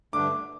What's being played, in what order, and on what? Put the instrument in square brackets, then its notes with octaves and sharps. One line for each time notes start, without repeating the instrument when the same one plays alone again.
[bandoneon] G2 D3 A3 D4 [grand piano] D6